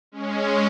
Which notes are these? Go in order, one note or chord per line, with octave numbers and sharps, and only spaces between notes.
G#3 C#4